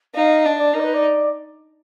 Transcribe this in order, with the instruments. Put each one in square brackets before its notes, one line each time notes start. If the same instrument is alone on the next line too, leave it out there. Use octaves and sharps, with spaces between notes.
[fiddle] D#4 [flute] F5
[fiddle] D4 [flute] D#5
[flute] D5
[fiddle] D#4 [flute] A#4
[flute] D5
B4
D5